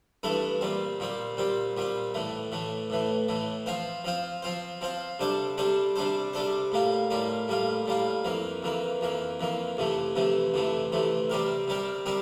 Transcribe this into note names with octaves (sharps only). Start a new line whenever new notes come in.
G2 E3 A3 E4 A4
A#2 G3 C4
A#2 G3 C4
A#2 G3 C4
A#2 G3 C4
A2 E3 A3
A2 E3 A3
A2 E3 A3
A2 E3 A3
F3 C4 F4 C5
F3 C4 F4 C5
F3 C4 F4 C5
F3 C4 F4 C5
C3 G3 D4 A4 C5
C3 G3 D4 A4 C5
C3 G3 D4 A4 C5
C3 G3 D4 A4 C5
A2 G3 A#3 F4
A2 G3 A#3 F4
A2 G3 A#3 F4
A2 G3 A#3 F4
F2 E3 A#3
F2 E3 A#3
F2 E3 A#3
F2 E3 A#3
F2 C3 E3 A3
F2 C3 E3 A3
F2 C3 E3 A3
F2 C3 E3 A3
C3 G3 C4 G4 A#4
C3 G3 C4 G4 A#4
C3 G3 C4 G4 A#4